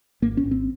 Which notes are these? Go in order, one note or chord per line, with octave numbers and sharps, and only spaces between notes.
G#1 A#3
C#4
G#1
C4